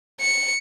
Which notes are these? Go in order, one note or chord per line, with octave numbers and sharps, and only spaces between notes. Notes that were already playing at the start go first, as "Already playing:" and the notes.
C#7